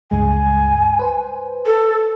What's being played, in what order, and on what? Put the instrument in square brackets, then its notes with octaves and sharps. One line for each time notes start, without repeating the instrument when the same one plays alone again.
[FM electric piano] C#2 G2 G#3 [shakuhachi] G#5
[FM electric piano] B4 C5
[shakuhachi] A4